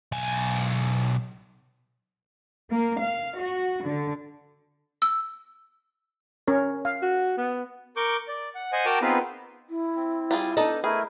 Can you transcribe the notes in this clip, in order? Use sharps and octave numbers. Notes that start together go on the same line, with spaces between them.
B1 G#5
A#3
F5
F#4
D3
E6
C#4 A#4 C#5
F5
F#4
B3
A#4 C#6 D6 G6
D5
F#5
C5 D#5 F#5 G#5
F#4 A#4 G5 A5 A#5 D6
B3 C4 D#4 F4 G#4 B4
E4
C4
G3 F4 G#4
B3 D4 D#4 A4 D#5
A3 E4 G#4 A#4 E5